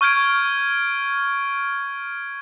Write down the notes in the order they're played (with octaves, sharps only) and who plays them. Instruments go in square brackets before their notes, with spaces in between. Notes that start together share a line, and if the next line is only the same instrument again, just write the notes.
[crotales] C#6 F6 G6 G#6 D7